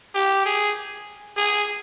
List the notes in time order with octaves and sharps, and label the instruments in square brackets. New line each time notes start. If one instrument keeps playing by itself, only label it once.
[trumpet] G4
G#4
G#4